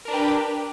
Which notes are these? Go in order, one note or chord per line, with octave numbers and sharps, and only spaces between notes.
D4 G4 A#4 B4